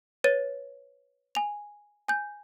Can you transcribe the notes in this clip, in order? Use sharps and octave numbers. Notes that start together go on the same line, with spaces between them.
B4 C#5 A6 D#7
G#5 F7
G#5 G6